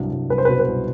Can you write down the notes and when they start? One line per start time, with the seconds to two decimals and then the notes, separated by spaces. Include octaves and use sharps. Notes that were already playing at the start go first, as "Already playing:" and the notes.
Already playing: C2 G2 F#3
0.11 C2
0.30 C2 B4
0.38 C5
0.45 B4
0.49 B2 C5
0.60 B4
0.68 C2